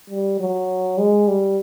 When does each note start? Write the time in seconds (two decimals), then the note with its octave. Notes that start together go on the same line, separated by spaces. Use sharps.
0.10 G3
0.40 F#3
0.98 G#3
1.28 G3